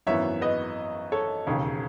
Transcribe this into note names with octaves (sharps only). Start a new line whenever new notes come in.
G#1 F#2 E3 B3 C#5 E5
B4 D#5
A4 C#5
E1 D#2 C#3